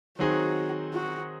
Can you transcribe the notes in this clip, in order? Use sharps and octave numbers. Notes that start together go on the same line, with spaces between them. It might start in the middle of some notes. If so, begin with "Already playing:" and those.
D#3 F#3 C4 D#4 F#4 G#4
F#4